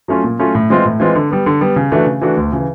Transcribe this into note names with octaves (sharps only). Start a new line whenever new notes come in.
F#3 A3 C#4 F4
A#2
F#3 A3 C#4 F4
A2
E3 G#3 C4 F4
A2
E3 G#3 C4 F4
D3
G3 B3
D3
G3 B3
C#3
E3 A3 D4 F#4
C#3
E3 A3 D4 F#4
D2
C#3 E3